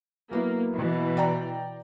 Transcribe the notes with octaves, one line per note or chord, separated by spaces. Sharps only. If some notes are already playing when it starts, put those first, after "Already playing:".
F#3 A#3 B3 E4
B2 E3
D5 G5 A#5